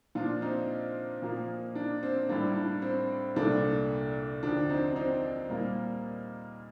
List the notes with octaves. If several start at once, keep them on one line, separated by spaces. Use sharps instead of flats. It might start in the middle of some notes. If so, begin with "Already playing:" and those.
A#2 F3 A#3 D4 F4
C4 D#4
A#2 F3 A#3
D4
C4
A2 G3 A#3 D4
D4
C4
C2 A#2 A3 D4
D#2 D3 F3 D4
C4 D#4
D4
C4 D#4
A#2 G3 A#3